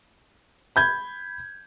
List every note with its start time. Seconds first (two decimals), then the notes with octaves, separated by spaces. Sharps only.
0.76 B5 G6 G#6